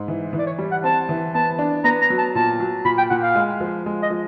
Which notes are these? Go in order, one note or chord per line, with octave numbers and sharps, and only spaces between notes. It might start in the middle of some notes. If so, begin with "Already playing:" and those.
Already playing: G#2
E3
E3
D5
C#5
G3
F#5
C4 A5
E3
B3 A5
D4
B3 A#5
A#5
F#3
A5
A#2 A5
F#3
A#2 B5
G5
A#2 F#5
F5
G#3
F3
G#3
D#5
F3